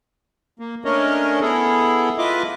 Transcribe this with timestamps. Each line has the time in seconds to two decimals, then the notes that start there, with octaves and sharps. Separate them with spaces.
0.59 A#3
0.85 A3 C#4 D4 A#4 C#5 D#5
1.41 B3 E4 G#4 A4
2.18 F4 B4 D#5 E5 D6